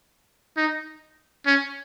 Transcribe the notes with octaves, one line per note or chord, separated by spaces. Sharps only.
D#4
C#4